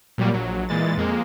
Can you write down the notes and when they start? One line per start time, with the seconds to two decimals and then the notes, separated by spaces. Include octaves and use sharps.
0.18 A#2 F#3 G3 A#3
0.34 A#1 F#3
0.69 A#2 E3 G#3 A6
0.97 F2 G#3 A#3